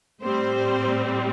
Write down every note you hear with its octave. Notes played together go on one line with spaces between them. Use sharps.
A2 G3 C4 C5